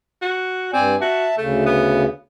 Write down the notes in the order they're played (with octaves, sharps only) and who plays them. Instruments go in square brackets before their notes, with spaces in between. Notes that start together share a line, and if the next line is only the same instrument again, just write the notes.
[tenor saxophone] F#4
[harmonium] G2 D5 G#5 [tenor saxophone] C4
[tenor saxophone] F#4 [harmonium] E5 A5
[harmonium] D2 C#3 [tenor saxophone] A3
[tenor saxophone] B3